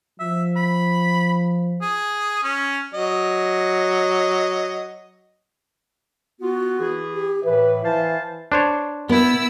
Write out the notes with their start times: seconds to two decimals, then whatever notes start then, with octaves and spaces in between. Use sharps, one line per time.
0.20 F3 E5
0.56 B5
1.82 G#4
2.44 C#4
2.94 F#3 D#5
6.40 B3 F4 F#4
6.79 E3 E4 G#4
7.13 G4
7.44 A2 E3 B4 E5
7.84 E3 C5 F5 A5
8.52 D4 C5 C#5
9.09 B3 E4 E6